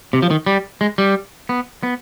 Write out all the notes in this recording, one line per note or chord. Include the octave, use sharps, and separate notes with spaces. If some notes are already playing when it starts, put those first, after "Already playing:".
C3
F3
D#3
G3
G#3
G3
B3
B3